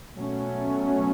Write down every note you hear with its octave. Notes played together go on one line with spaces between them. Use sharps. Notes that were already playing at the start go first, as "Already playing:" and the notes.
B2 F#3 A3 C#4